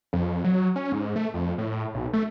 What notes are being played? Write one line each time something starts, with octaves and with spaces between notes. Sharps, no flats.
F2
F#3
C#4
G#2
A3
F2
A2
B1
A3